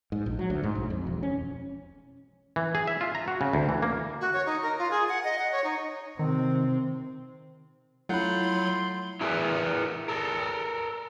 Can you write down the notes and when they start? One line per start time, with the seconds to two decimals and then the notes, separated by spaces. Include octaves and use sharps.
0.12 G#2
0.26 A#1
0.39 F#3
0.50 D2
0.63 G#2
0.75 B1
0.90 F2
1.07 E1
1.23 C#4
2.56 E3
2.75 G#4
2.87 E5
3.01 F4
3.15 A#5
3.28 F#4
3.41 C#3
3.53 D2
3.69 E3
3.82 A#3
4.21 F#4
4.33 C#5
4.46 D#4
4.62 A#4
4.78 F4
4.91 G#4
5.09 F#5
5.24 D#5
5.39 F#5
5.52 C#5
5.64 D#4
6.19 C3 D#3 C4
8.09 F#3 A3 E4 F4 F#5 B5 C6 G6
9.21 E4 G#4 A#4 B4 E5
10.08 A4 A#4